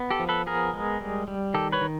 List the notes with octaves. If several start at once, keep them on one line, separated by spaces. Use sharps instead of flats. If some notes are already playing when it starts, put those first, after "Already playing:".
Already playing: B3
G4 A4
F3
A4 B4
B3 G#4 A#4
G#3
G3
G3
D#3 G4 A4
B4 C#5
D#3